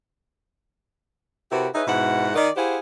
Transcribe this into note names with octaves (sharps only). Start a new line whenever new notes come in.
C3 E4 F#4 G4 A#4 B4
D#4 G#4 B4 C#5 D#5 E5
G#2 B2 G#3 E4 F#5
D#3 D5 D#5
E4 G4 G#4 C5 F5 F#5